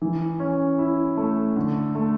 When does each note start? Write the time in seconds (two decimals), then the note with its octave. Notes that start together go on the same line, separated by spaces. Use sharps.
0.02 E3
0.40 C#4
0.78 E4
1.17 A3
1.56 D3
1.95 A3